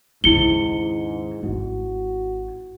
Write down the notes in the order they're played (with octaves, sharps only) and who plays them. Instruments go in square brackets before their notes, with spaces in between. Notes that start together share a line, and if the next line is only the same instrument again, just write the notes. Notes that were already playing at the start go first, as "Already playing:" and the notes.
[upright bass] D#2 C#3 [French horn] G#2 [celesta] E4 C#7 G7
[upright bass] G#1 [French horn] F#4